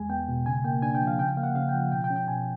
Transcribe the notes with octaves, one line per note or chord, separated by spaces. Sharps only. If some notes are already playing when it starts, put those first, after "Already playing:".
Already playing: E2 G#3 G#5
B3 G5
B2
C#3 G#5
A#3 G5
D4 G#5
G5
F3
F5
C#3 G5
A#3 F5
F#5
C#3 F5
G5
F3 F#5
B2 G5
G5
C#4
G5
B2 G#5